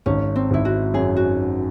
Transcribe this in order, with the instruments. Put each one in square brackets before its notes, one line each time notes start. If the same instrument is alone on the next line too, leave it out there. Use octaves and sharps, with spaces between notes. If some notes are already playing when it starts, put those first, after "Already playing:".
[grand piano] G#1 [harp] C#4
[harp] C4
[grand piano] G#1 [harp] E4
[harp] F#4
[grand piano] F#2 [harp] G#4
[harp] F#4